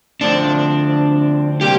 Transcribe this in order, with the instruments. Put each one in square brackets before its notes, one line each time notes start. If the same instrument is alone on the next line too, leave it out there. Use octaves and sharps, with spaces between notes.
[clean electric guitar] D2 D3 F3 C4 [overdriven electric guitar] D4
[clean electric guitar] C3 G3 A#3 [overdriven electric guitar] G4